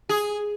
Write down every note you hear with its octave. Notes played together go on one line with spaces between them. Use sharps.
G#4